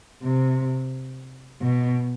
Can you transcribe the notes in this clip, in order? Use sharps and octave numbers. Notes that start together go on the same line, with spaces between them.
C3
B2